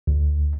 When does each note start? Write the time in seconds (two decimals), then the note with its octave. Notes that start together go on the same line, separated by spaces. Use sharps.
0.07 D2